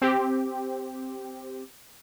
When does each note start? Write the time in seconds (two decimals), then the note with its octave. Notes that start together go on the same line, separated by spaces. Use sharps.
0.02 C4 G4